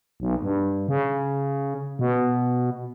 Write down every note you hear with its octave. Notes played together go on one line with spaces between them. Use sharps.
B1
G2
C#3
B2